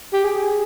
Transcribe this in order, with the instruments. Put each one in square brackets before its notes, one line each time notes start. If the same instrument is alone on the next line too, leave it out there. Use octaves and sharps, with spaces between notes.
[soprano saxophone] G4
G#4